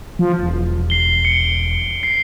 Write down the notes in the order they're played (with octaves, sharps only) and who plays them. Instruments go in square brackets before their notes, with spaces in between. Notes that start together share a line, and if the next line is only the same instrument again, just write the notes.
[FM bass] F3
E1
[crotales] C7 G7
C#7 D7
C7